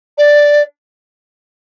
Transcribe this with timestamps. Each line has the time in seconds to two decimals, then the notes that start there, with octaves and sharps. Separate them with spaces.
0.18 D5